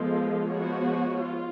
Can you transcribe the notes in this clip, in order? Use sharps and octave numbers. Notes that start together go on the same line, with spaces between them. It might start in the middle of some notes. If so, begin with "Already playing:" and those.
Already playing: F3 G#3 B3 F4 A4
F3 G#3 B3 F#4 C#5
F4